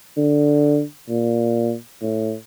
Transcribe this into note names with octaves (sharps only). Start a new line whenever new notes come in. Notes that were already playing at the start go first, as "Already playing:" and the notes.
D3
A#2
A2